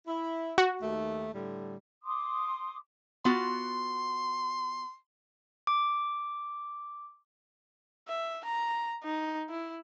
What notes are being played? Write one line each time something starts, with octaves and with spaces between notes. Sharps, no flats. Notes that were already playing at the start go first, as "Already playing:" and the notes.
E4
F#4
D#2 D#3 A3
A2 D3 G3
C6 D6 D#6
B3 F4 F#4 C6
D6
E5
A#5
D#4
E4